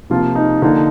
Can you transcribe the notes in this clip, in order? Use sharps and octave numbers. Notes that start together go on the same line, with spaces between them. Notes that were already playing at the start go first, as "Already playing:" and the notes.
C3 F3 A#3 F4
D#4
D3 F3 A#3 D#4